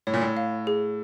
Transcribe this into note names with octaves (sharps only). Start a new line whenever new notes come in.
A2 C#5
A#2
A2
F5
G#4